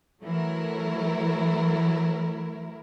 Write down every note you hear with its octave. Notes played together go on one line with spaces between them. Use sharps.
E3 F#3 A3 E4 A#4